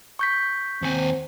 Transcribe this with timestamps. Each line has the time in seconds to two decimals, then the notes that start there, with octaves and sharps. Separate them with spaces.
0.19 C#6 G6 B6
0.82 D#2 C4 G#5